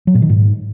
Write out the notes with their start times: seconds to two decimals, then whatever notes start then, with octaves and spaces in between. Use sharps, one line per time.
0.07 F#3
0.15 A#2
0.22 D#3
0.29 G#2